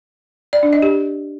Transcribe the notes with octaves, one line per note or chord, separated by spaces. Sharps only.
D5
D4
D#5
G4